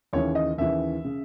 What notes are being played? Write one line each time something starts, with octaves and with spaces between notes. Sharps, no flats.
D#2 C#3 E3 C#5
D#5
D#2 C#3 E3 E5
C#3